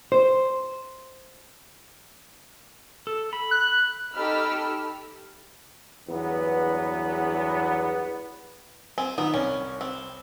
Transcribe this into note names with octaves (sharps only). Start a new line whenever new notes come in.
C5
A4
B5
F#6
D#4 G4 A4 B5 E6 F6
E2 G2 F#3 B3
C4 G#5
D#3 B3
C2 C#4
C4